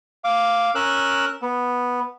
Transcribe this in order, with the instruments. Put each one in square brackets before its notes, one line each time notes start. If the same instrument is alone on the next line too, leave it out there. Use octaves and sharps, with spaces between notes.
[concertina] F5 D6
C#4 A#4 E6 F#6
B3